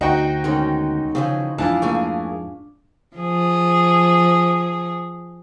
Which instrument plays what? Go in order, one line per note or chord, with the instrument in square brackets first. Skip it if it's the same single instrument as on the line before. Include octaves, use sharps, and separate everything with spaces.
[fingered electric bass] D2 [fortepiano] D#4 F#4 G5 [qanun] C5 [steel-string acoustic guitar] F#5
[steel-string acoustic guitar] B2 G#3 C#4 [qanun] D#3
[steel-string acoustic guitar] C#3 E3 F3 [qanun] G#4
[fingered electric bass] F2 G#2 [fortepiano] E3 [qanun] D4 F4 D5 [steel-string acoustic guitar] A5
[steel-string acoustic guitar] A3 A#3 G#4
[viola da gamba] F3 G#4